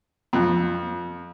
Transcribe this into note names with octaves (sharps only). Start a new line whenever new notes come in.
F2